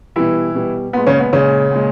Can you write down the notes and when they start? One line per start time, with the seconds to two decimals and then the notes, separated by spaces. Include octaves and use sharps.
0.16 B2 E3 G3 E4
0.54 B2 G3
0.93 A#2 G#3 B3
1.06 C#3 C#4
1.19 B3
1.32 A#2 C#3 G#3 C#4
1.71 A#2 G#3